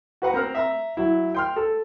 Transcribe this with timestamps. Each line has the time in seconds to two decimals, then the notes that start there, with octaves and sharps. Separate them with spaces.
0.22 F#4 B4 F#5 A#5
0.34 C4 A#4 A#5 F6
0.55 E5 A#5
0.97 F#3 E4
1.35 G5 C6 F6
1.56 A4